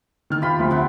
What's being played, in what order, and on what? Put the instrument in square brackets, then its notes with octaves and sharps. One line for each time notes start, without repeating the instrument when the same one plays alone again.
[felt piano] D#3 F6
[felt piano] F4 [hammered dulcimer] G4 B5 C6
[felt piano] D2 F3
[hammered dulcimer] C3 F#5